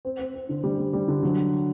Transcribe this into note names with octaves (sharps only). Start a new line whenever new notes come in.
C4
C4
C4
D3
G3
G3
G3
D3
F#3